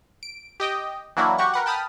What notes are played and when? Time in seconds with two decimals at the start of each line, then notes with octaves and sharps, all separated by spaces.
0.23 D7
0.60 G4 D#5 G5
1.17 E3 F#3 A#3 D4 E4 F#4
1.38 F#4 G4 F#5 C#6
1.54 A#4 B4 F#5
1.66 G5 A5 B5 D#6 F6